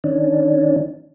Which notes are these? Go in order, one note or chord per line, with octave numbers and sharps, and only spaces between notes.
D#3 C#4 D4